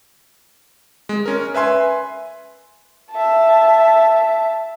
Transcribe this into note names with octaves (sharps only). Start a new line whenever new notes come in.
G#3
C#4 A#4
B4 E5 G#5 C6
E5 A5